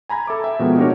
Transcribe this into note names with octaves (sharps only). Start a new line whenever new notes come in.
G#5 A#5 B5 G#6
A4 E5 D6
E5 G5
B2 F3 G#3 A#3 B3
D4 D#4 F#4 G4 A#4 C#5